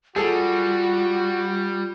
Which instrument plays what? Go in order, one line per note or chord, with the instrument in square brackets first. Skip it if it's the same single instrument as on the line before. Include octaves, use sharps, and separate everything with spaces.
[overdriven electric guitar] G3 [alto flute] F4 [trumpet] F#4 [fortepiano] G#4 A4